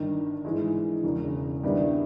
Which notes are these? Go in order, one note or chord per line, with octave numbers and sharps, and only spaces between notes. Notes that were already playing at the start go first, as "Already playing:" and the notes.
Already playing: G1 G2 D#3
G#2 E3 G#3 D#4
E1 E2 C#3
G2 D#3 G3 B3 E4